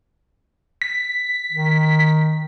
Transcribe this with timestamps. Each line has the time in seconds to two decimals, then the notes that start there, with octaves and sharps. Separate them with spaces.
0.82 B6
1.52 D#3